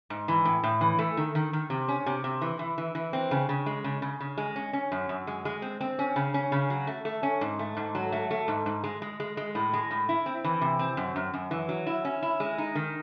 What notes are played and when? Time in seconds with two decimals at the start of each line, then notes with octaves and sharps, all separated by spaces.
0.10 G#2
0.28 E3
0.45 A2
0.64 A2
0.81 E3
0.99 A3
1.17 D#3
1.35 D#3
1.53 D#3
1.70 C3
1.88 C#4
2.06 C3
2.24 C3
2.42 E3
2.59 E3
2.78 E3
2.95 E3
3.13 C4
3.31 C#3
3.49 C#3
3.66 G#3
3.84 C#3
4.02 C#3
4.20 C#3
4.38 G#3
4.56 C#4
4.73 C#4
4.92 F#2
5.09 F#2
5.27 G#3
5.45 G#3
5.62 C4
5.81 C4
5.99 C#4
6.16 C#3
6.34 C#4
6.52 C#3
6.70 F#3
6.87 A3
7.05 A3
7.23 C#4
7.41 G#2
7.59 A3
7.77 G#2
7.95 F#3
8.12 A3
8.31 A3
8.48 G#2
8.66 G#2
8.84 G#3
9.02 G#3
9.20 G#3
9.37 G#3
9.55 A2
9.73 G#3
9.91 A2
10.09 E4
10.26 C4
10.44 E3
10.61 C3
10.79 C4
10.97 F#2
11.16 F#2
11.34 F#2
11.51 E3
11.69 F#3
11.86 E4
12.05 C#4
12.22 E4
12.40 G#3
12.58 D#4
12.75 D#3